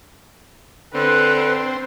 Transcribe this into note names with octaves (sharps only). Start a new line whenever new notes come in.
D3 C4 B4